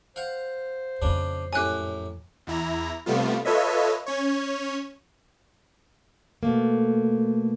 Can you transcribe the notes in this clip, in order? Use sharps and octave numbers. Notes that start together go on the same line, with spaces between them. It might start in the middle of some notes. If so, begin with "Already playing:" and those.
C5 F5 F#5
F2 A#2 C#3 D4
F#2 A2 G4 G#5 F#6
E2 E4 A#5
C3 G3 A3 B3 F4
F4 A4 B4 C#5 D#5 E5
C#4 C#5
B2 A3 A#3